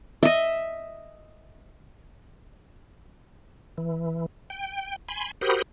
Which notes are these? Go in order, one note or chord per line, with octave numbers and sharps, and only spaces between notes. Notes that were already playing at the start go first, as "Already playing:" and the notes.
D#5 E5
E3
G5
G#5 B5 C6
F#4 G4 A#4 C5 B5 D#6